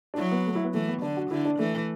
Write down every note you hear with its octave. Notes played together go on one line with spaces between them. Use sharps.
D4
F#3 E4
B3
A3
E4
B3
E3 A3
B3
D3 D4
F#4
D3 E4
D4
E3 A3